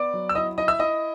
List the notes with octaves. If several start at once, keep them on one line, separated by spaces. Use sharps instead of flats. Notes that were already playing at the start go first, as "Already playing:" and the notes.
Already playing: B3 D5 D6
F#3
E6
E4 D#5 D#6
E4 D#5 D#6
E5 E6
E4 D#5 D#6